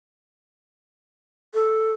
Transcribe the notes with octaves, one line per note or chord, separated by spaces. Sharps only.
A4